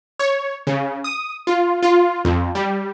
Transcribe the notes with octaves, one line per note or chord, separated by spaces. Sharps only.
C#5
C#3
D#6
F4
F4
F2
G3